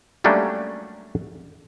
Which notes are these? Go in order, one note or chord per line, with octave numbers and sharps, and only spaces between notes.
F#3 G3 A3 A#3 C#4 D4